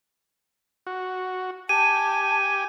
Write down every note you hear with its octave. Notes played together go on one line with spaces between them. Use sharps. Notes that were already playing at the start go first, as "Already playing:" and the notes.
F#4
G4 G#5 A5 D#7